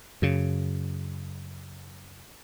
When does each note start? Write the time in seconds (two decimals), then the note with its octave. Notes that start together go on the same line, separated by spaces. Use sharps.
0.22 F#2 C#3